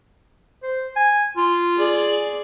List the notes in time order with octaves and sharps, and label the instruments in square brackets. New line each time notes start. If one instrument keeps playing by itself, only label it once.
[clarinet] C5
G#5
F4
[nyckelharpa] G#4 D5